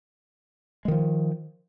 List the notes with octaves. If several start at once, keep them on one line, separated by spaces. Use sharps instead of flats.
D#3 F3 G#3